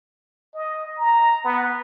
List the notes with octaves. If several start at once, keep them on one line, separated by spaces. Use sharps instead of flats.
D#5
A#5
B3